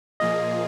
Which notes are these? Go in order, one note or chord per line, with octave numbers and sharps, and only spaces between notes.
A#2 F3 A#3 F4 G#4 D#5